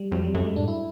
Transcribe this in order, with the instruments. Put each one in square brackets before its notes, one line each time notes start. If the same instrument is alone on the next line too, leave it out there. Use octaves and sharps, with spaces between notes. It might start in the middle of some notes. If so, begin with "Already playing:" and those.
Already playing: [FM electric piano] G3
[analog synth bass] F2 [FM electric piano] F#3
[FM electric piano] G3
[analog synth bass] F#2 [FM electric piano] A3
[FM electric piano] G#3
[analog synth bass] A2 [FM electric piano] D4
[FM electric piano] E4